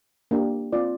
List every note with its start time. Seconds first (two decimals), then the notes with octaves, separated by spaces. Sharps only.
0.31 A#3 D4 G4
0.73 C4 F4 D5